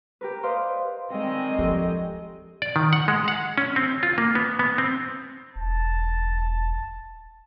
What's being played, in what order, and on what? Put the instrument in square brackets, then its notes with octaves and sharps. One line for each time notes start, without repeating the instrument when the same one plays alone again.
[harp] G4 A#4 B4
B4 C5 D5 D#5 F5 C6
[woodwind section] D3 D#3 C4 [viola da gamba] G#3 D#5
[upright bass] F3 [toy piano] G4 A4
[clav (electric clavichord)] D5
D#3
F#5
G#3
F#5
C#4
C4
F4
A#3
B3
B3
C4
[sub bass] E1 [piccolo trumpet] A5